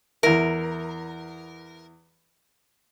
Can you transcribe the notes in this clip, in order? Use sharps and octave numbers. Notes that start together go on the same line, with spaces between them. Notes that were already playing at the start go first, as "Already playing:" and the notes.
E2 E4 A#4